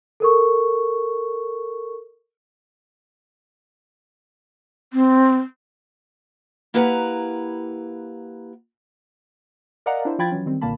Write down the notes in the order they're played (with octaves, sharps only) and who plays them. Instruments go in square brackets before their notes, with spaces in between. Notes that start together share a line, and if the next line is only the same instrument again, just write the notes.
[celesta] A4 A#4 C#6
[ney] C4
[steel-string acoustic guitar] A#3 E4 G4 B4 F#5 A#5
[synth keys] A#4 D5 D#5 F5 F#5 A#5
D4 E4 C5
F3 F4 G5 B5 G#6 A6
E3 F#3 C#4
D#3 G3 C4
B1 A#2 D3 A#3 A5 B5